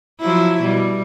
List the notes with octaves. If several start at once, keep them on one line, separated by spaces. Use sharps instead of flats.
F3 F#3 E4
B2 G3